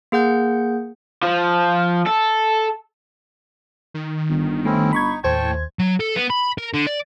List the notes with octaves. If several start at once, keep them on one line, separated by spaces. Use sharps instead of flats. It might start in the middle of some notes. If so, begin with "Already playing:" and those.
A#3 G#4 F#5 G6
F3
A4
D#3
G1
A3 C4 C#4 E4
D#4 B5 C#6 G#6
D#2 A2 C5 G5 A5 C#6 G#6
F#3
A4
B3
B5
A#4
D3
D5